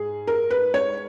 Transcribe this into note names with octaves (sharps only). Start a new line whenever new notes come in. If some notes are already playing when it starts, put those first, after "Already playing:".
Already playing: G#2 G#4
A#4
B4
C#5